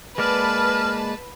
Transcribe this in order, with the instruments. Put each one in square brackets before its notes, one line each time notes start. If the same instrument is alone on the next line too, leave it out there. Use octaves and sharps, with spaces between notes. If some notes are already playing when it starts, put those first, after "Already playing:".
[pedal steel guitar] G#3 A#3 D5 [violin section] B4 A5 [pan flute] F6